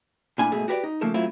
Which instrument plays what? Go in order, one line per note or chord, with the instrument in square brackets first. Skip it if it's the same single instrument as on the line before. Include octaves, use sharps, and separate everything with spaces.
[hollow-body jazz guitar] A#2 A3 D4 E4 G#5 B5
G#2 B2 A3 G#4
F#4 G4 B4 C#5 D5
D#4
C#3 F3 A3 A#3 A4
F#3 A3 C4 E4 F4